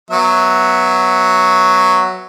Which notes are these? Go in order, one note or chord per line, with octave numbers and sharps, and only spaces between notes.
F#3 B3 E5